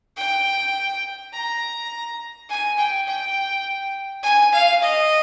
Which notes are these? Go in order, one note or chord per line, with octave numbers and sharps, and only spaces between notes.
G5
A#5
G#5
G5
G5
G#5
F5
D#5